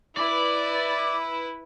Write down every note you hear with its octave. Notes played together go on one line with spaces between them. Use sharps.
E4 B4 D5